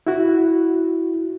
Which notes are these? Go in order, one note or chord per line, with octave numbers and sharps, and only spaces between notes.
E4 F#4